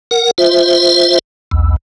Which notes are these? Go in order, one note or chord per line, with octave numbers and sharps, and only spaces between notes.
A#4 F#5
F4 C5 E5
B1 E2